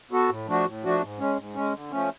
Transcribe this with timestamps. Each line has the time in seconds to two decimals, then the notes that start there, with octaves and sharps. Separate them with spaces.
0.11 B3 F#4 A4
0.29 A2
0.48 F3 A3 D4 F#4
0.66 A2
0.84 F3 A3 D4 F#4
1.02 G#2
1.19 G#3 C#4
1.38 G#2
1.55 G#3 C#4
1.74 D3
1.91 F3 A3 C#4